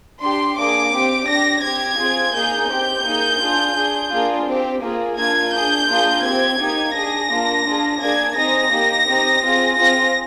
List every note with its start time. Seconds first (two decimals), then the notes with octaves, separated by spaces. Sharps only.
0.21 D4 G4 C6
0.57 A#3 D4 G#4 D6
0.92 C4 G4
1.27 D4 G4 A#6
1.63 C4 G4 G#6
1.98 C4 F4 G#4
2.33 A#3 D#4 G#4 G6
2.69 C4 G4 G6
3.04 A#3 D#4 G#4
3.40 D4 F4 G#4
3.75 D4 G#4
4.11 A#3 D4 F4 G#4
4.47 C4 G4
4.82 A#3 F4 G#4
5.17 A#3 D4 F4 G#6
5.52 D4 G#4 G6
5.88 A#3 D4 F4 G#4
6.23 C4 G4 G#6
6.59 A#3 D#4 G4
6.94 D4 G#4 A#6
7.30 A#3 D4 F4
7.65 D4 F4 G#4
8.00 A#3 D4 G#4 G#6
8.36 C4 D#4 G#4 A#6
8.71 A#3 D#4 G4
9.07 C4 D#4 G4
9.42 C4 F4 G#4
9.77 C4 F4 G#4 A#6